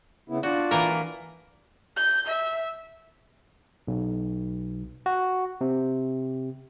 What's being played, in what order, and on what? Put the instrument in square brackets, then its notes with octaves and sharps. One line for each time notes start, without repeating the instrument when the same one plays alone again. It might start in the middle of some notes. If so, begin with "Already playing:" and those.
[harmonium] C#3 B3 E4
[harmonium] D4 F4 D5 [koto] F#4
[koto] E3 A#3 A#4
[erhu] G6
E5
[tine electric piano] B1
F#4
C3